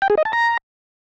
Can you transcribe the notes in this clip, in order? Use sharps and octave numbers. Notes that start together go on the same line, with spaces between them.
G5
G#4
D#5
A5
A#5